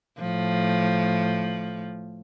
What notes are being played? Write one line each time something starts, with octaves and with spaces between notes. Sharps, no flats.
A2 F3